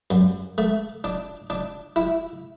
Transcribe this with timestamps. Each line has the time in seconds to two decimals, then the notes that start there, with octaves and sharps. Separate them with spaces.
0.10 F#2
0.58 A3
1.04 D4
1.50 D4
1.96 E4